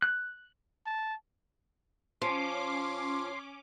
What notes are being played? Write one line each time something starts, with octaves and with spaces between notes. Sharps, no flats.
F#6
A5
F3 C#4 C6 D6